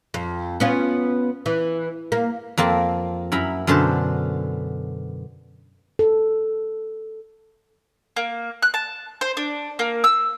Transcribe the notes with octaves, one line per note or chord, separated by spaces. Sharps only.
F2
B3 C#4 F4
E3
A#3
F2 A#3 C4 A5
F#2 E4 A#5 B5
F#2 B2 D3 C5 A5
A4
A#3
F#6
A5
C5
D4
A#3
E6